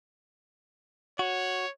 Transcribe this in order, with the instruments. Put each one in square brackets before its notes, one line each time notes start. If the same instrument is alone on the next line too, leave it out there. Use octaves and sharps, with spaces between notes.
[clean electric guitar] F#4 [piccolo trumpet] C#5